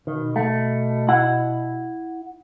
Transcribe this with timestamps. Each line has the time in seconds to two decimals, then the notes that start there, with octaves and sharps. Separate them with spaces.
0.07 B2 D#3
0.36 A3
1.09 E4 F#5